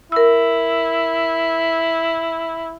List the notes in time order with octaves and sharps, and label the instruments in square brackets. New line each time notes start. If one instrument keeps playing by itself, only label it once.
[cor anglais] E4 [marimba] A#4 E6